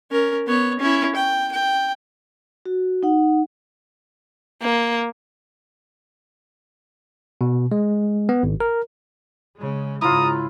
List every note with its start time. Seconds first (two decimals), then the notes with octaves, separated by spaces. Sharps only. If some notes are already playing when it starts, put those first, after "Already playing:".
0.11 C#4 A#4
0.46 B3 C#5
0.79 C#4 E4
1.15 G5
1.52 G5
2.66 F#4
3.03 D#4 F#5
4.62 A#3
7.41 B2
7.72 G#3
8.29 B3
8.43 G#1
8.60 A#4
9.57 C#3 G#3
10.02 G#2 C#3 E4 F4 A#5 D#6